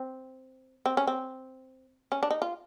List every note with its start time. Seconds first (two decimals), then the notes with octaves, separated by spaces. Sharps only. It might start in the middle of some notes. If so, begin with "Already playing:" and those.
Already playing: C4
0.86 C4
0.97 C#4
1.07 C4
2.12 C#4
2.23 D4
2.31 D#4
2.42 F4